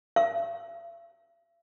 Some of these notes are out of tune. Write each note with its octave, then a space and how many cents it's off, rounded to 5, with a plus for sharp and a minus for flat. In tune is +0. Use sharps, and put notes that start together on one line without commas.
E5 +45